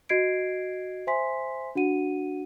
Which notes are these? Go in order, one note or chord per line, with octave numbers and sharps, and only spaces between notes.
F#4 D#5 G#6 C7 D7
C5 E5 G#5 C6 B6
D4 F#4 F#5 D#7